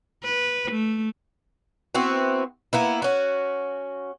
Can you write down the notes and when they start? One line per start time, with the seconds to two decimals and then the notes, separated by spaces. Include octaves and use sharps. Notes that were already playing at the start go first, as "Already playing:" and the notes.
0.24 B4
0.71 A3
1.95 B3 C4 E4 F#4
2.73 A#3 B3 E4
3.02 C#4 F#4